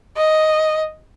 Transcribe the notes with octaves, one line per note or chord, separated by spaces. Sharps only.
D#5